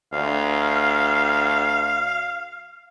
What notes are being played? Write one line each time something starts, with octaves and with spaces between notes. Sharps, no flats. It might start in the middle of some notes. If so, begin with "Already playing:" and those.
D2 F5